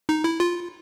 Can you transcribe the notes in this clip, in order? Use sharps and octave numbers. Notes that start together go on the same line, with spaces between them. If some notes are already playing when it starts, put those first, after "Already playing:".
D#4
E4
F4